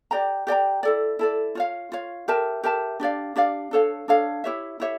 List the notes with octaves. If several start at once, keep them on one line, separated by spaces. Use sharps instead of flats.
G4 D5 G5 A#5
G4 D5 G5 A#5
E4 A4 D5
E4 A4 D5
F4 C#5 F5
F4 C#5 F5
G4 A#4 E5 A5
G4 A#4 E5 A5
D4 G4 D5 F5
D4 G4 D5 F5
D4 A4 C#5 F5
D4 A4 C#5 F5
E4 G4 C#5 E5
E4 G4 C#5 E5